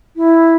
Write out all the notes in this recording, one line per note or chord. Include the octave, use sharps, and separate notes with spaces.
E4